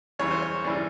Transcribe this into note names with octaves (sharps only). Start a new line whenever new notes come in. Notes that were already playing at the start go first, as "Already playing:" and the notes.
E2 C#3 E3 G3 C#5
C5
C#5
E2 C#3 E3 G3 D5